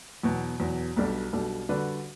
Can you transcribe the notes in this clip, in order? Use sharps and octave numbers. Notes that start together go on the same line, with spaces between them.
E2 B2 F#3
E2 B2 F#3
B1 B2 G3 D4 A4
B1 B2 G3 D4 A4
D3 G3 D4 F#4 B4